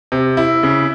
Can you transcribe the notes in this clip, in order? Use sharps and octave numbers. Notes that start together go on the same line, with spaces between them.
C3
E4
C#3